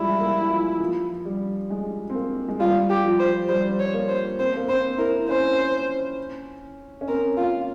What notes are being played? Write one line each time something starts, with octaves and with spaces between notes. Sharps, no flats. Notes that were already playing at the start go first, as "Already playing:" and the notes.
Already playing: E3 F3 G3 G#3 E4
A#3
F3
F3
G3
G#3
C4
A#3
G#3
G3 F4
G4
F3
C5
G3 C5
C#5
A#3
C5
C4 C5
A#3
C4 C5
E4 A#4
C#4 C5
C#4
C4 A#4
A#3 F4